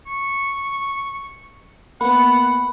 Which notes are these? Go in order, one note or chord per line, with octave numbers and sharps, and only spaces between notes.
C#6
A#3 B3 F#5 B5